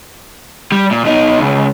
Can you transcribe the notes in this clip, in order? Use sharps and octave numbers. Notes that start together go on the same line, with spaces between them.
G3
A#2
B2 D#4
C#2